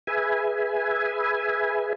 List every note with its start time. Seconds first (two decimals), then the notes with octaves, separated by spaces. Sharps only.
0.07 G#4 B4 E5 G#5